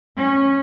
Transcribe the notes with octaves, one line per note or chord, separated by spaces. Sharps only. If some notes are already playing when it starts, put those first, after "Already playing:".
C#4